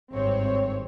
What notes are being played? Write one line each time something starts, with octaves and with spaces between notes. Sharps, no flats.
G#1 G2 C4 C#5